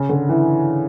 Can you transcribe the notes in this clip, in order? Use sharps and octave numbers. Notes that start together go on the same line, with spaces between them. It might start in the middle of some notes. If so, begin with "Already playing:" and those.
Already playing: C#3
D3
E3